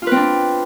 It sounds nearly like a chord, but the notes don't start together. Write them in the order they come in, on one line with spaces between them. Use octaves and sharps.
F4 B4 C4 D4